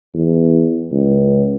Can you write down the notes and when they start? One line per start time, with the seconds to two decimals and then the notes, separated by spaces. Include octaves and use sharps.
0.14 E2
0.91 C#2